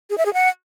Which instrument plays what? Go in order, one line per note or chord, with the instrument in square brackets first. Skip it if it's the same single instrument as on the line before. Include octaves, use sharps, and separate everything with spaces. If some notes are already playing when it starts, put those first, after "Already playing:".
[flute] G#4
E5
G#4
F#5